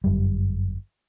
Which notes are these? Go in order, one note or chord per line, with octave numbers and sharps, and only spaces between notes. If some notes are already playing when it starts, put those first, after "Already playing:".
G1 F#2 G3